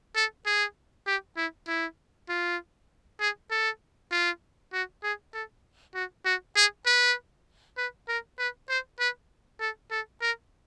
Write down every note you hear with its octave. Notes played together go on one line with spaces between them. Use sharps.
A4
G#4
G4
E4
E4
F4
G#4
A4
F4
F#4
G#4
A4
F#4
F#4
G#4
B4
B4
A#4
B4
C5
B4
A4
A4
A#4